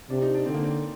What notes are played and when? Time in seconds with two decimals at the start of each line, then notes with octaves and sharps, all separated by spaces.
0.10 C3 D4
0.22 D#4
0.34 D4
0.46 D3 C4
0.54 A#3
0.64 C4